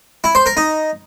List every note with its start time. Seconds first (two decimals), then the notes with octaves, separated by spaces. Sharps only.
0.24 E4
0.35 C5
0.46 A#4
0.57 D#4